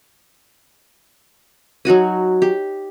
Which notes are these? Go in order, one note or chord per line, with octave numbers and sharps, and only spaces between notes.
F#3 D#4 F#4 G#5
G4